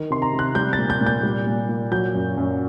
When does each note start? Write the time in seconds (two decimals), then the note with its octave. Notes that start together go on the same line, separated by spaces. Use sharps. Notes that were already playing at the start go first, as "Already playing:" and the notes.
Already playing: D#3
0.10 C3 C6
0.22 A#5
0.33 C3
0.39 F#6
0.55 G3 G6
0.73 A6
0.78 A#2
0.90 G6
1.01 A#2
1.06 G6
1.23 G3
1.47 A#2
1.69 A#2
1.92 F#3 G6
2.14 F#2
2.37 F#2